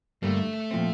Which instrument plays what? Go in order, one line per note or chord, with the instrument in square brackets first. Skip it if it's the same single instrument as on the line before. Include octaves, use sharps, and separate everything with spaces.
[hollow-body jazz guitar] G2 D3 G3 A#3 [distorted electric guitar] A3
[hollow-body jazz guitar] A#2 F3 C4